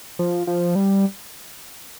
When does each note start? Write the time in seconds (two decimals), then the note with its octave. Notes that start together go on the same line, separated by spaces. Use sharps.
0.19 F3
0.47 F3
0.75 G3